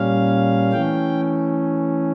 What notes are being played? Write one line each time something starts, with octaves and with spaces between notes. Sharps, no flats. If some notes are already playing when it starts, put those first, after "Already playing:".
Already playing: A#2 G3 C#4 F5
E3 A3 C#4 G5